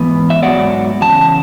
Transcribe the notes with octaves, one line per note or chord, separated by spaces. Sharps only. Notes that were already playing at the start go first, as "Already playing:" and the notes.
Already playing: G#2 E3 B3
E5
G#2 F#3 B3 D5 F#5
E2 C#3 A5